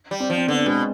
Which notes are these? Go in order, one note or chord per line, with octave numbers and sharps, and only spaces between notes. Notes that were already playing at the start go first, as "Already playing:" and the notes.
G3
C4
F3
C4
D3 B3
B2 G#3